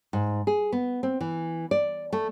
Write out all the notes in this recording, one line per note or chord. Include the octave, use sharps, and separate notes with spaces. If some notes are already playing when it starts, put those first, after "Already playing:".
G#2
G#4
B3
C4
E3
D5
A3